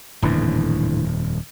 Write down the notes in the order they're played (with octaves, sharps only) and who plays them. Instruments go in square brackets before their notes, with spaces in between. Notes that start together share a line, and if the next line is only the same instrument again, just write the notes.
[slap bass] D#1 F2 [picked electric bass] A2 D3 E3